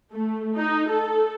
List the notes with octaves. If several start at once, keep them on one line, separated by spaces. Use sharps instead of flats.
A3
D#4
A4